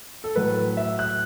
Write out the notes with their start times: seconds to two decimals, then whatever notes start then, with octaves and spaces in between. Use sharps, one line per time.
0.24 A4
0.35 A2 F#3 A3 B4
0.77 E5
0.99 F#6